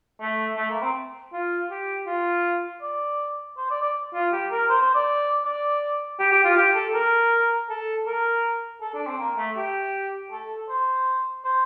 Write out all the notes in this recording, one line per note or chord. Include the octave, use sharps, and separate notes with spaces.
A3
A3
A#3
C4
F4
G4
F4
D5
C5
D5
D5
F4
G4
A#4
C5
C5
D5
D5
G4
G4
F4
G4
A4
A#4
A4
A#4
A4
D4
C4
A#3
A3
G4
A4
C5
C5